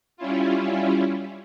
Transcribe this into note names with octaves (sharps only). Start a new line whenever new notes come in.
G3 C#4 E4 F4